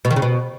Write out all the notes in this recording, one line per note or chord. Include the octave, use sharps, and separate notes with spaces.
B2
D#3
C#3
B2